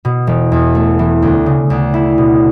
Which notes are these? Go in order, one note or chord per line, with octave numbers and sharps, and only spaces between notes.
B2
E1
E2
A3
E3
D2
C#3
D2
E4
B2